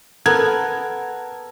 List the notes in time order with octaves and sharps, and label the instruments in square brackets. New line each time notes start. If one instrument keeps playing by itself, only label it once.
[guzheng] B3 [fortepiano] A4 A#4 [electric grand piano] G#6